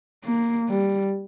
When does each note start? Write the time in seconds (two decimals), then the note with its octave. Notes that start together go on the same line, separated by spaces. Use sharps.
0.25 A#3
0.69 G3